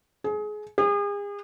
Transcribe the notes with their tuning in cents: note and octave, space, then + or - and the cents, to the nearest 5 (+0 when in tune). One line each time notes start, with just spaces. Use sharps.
G#4 +25
G#4 -40